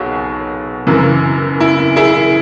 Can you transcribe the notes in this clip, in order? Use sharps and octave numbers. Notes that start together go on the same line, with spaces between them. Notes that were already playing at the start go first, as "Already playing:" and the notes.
Already playing: B1 B2 F#4 G#4 C#5
F#1 F#2 E3
E4
E4 G#4